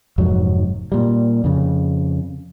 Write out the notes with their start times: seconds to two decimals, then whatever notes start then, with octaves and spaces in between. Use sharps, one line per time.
0.18 F1 F2 G#2 F#3
0.92 A#2 G3
1.44 F2 C#3